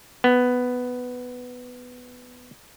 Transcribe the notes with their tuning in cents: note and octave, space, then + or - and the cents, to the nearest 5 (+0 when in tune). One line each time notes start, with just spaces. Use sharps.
B3 +5